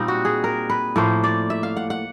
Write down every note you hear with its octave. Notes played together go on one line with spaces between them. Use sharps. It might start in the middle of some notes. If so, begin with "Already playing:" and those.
Already playing: A#2 G3 C4 D#4
F#4
G#4
A#4
B4
A2 F3 A#3 C5
D5
E5
F5
F#5
F#5